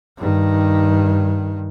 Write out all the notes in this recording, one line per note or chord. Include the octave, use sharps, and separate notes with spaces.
G2 D#3